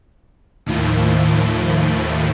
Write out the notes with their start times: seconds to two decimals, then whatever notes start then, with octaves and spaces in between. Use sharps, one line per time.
0.66 D#2 A2 D#3 F3